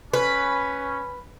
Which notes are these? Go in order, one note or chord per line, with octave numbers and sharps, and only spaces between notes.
C#4 B4